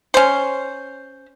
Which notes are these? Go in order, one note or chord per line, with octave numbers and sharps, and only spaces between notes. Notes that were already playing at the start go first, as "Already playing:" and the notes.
C#4 C5